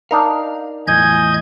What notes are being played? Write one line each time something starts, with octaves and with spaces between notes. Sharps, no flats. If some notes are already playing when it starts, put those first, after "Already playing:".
D4 D#4 A#4 F5
E2 A2 F3 D#5 G#5 G6 G#6